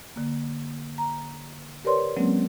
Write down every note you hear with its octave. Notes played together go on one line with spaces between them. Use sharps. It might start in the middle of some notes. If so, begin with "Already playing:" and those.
D3 A#3
A#5
G4 A#4 B4 C#5 D5 C6
F#3 G#3 A#3 C4 C#4